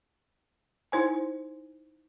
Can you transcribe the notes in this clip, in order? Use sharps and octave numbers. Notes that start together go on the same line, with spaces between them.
D#4 E4 C5 G#5